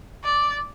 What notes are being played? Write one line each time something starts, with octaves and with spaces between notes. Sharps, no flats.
D5